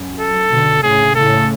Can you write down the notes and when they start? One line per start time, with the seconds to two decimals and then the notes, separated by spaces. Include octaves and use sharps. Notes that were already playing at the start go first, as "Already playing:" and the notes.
Already playing: F#2
0.20 A4
0.51 B2 D3
0.83 A2 C#3 G#4
1.15 A2 C#3 A4